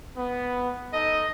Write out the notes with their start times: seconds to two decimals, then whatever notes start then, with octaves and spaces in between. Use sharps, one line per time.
0.17 B3
0.93 D#4 A4 D#5